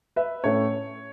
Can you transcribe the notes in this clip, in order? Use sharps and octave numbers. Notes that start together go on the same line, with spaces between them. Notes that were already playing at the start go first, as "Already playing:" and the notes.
B4 E5
A2 A3 C#4 C#5